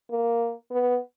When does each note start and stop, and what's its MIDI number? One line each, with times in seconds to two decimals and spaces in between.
0.10 0.54 58
0.71 0.97 59